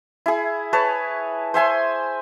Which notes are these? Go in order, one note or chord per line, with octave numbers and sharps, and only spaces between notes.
E4 G#4
G#4 B4 C#5 A5
C5 E5 G#5 C6